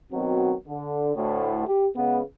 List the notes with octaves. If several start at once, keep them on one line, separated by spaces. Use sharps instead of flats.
B2 D#3 F#3 C4 F#4
D3
D2 A2
G4
C#3 G#3 B3